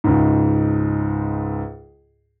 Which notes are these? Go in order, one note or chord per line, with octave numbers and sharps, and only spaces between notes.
C#2 G#2